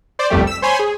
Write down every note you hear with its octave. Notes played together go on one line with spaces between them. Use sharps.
C5 D5
G1 C2 F2 G3 A3 G4
E6 B6
C5 C#5 G#5 B5 C6
G#4